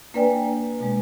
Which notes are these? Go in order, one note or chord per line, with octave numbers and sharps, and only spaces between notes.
A#3 D4 B4 D5 G5 G#5
B2 G#3